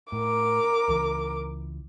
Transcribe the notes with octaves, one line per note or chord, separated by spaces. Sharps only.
A2 A#4 D6
C#2 E3